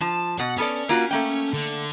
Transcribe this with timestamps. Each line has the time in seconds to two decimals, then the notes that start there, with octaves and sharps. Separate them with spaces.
0.01 F3 A5
0.40 B2 F#5
0.58 B3 C#4 A4 D5
0.89 A#3 F4 F#4
1.11 A3 A#3 G5
1.53 D3